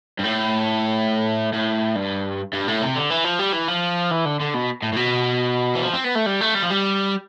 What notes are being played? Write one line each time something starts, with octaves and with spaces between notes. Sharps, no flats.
G2
A2
A2
G2
G2
A2
C3
D3
E3
F3
G3
E3
F3
E3
D3
D3
B2
A2
A2
B2
E3
F3
C4
B3
A3
G3
A3
G3
F3
G3